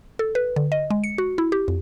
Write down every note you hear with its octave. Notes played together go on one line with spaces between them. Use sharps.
A4
B4
D3
D#5
G#3
C#7
F#4
E4
G4
F2